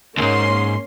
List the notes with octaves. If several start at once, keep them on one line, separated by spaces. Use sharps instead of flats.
C#2 G#2 A#3 C#4 C6